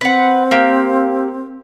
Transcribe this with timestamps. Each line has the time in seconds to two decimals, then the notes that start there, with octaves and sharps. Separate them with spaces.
0.01 C4 B4 F#5
0.51 A#3 G4